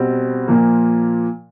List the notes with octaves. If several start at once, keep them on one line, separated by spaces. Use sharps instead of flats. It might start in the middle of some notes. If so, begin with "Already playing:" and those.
Already playing: B2 G3 C4
A#2 F3 A#3